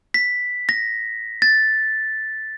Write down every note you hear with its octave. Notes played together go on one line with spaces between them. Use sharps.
B6
A#6
A6